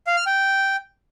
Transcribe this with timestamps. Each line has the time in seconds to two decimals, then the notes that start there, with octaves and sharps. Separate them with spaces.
0.07 F5
0.17 F6
0.26 G5